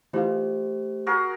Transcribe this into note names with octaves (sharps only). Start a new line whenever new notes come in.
E3 A3 F4 G4 C5
F#4 G#4 A#4